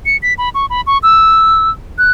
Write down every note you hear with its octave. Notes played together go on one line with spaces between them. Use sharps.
C#7
B6
B5
C#6
B5
C#6
E6
F#6